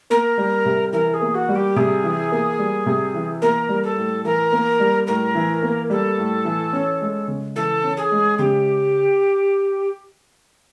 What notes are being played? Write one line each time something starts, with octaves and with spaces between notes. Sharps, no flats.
A#3 A#4
G3
C3
E3 A#4
G#4
A#3
F#4
G3
G4
C3 G#4
E3
A#3
G3
C3
E3
A#3 A#4
G3
A4
A2
E3 A#4
A#3
G3
A2 A#4
E3
A#3
G3 A4
A2
E3
C#4
G#3
C#3
E3 A4
C#4
G#4
G#3
C#3 G4